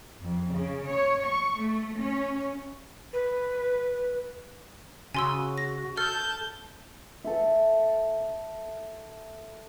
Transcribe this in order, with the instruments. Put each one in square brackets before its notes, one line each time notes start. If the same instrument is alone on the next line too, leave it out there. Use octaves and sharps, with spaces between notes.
[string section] F2
C#3
C#5
C#6
A3
C#4
[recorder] B4
[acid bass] C#3 [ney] F#4 [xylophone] G#5 C6 E6
[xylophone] A#6
[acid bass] A4 [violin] A5 G6 [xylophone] F6
[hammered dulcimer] A4 E5